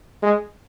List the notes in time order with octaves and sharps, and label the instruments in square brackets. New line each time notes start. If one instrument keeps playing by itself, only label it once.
[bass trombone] G#3